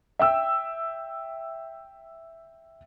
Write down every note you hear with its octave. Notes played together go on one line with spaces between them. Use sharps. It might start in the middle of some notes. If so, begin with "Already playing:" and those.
E5 G5 E6